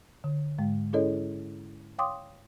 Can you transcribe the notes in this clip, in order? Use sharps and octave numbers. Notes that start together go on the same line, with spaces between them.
D3
G#2 G#3 F5
C#4 E4 G#4 A4 C#5 D#5
C#5 F5 G5 C6 D6 D#6